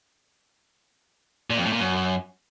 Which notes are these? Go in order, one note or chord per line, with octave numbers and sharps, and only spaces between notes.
A#2
F2
A2
A#2
F#2